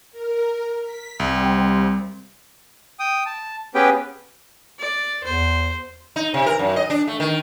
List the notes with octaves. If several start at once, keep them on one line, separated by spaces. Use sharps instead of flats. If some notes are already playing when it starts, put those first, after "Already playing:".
A#4
B6
C2 G3 C4
G5 D#6
A5
B3 C#4 G4 G#4 B4 G5
D5
E2 C5
D#4
C3
A#4
F#2
D#5
D4
A3
D#3